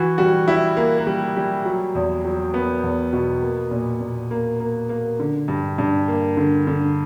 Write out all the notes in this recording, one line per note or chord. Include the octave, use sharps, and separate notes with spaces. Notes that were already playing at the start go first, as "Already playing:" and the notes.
Already playing: E3 F#4
G3 F#4
G3 E4
A#3
A#3
G3
G3
F#3
E2
F#3
A#3 B3
E2
B2
A#3
A#2
A#2
A#3
A#3
A#3
D3
G2
G2
A#3
D3
D3